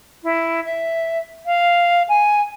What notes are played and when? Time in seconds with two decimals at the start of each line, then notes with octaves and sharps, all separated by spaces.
0.24 E4
0.65 E5
1.46 F5
2.09 G#5